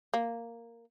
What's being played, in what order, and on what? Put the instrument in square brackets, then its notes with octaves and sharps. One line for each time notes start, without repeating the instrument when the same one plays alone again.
[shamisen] A#3